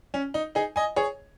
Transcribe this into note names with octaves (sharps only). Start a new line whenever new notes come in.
C#4
D#4
D#4 G#4
D#5 G#5
G#4 C#5